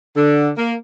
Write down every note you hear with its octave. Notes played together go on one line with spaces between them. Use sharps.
D3
A#3